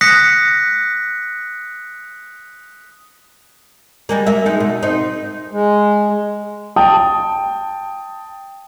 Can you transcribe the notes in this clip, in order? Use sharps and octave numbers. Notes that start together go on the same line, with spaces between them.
D#6 F#6 A#6 B6 C#7
G3 G#3 A#3
A#3 A#4 E5
G#3 D#4
B2
C4 D#4
G#3
G5 A5 D#6